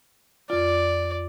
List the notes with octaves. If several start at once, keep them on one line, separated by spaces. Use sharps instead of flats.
F2 F4 D5